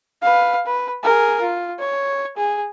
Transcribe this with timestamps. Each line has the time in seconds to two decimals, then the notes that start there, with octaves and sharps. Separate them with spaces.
0.22 B4 F5
0.66 B4
1.03 G#4 A#4
1.41 F4
1.79 C#5
2.37 G#4